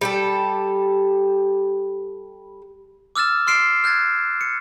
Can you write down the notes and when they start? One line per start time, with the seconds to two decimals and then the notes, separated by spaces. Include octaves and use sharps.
0.01 G3 G4 A4
3.16 D6 E6 F6 A6 E7
3.47 C6 F6 C7 D7 E7
3.84 F6 F#6 G#6 A6
4.41 C#7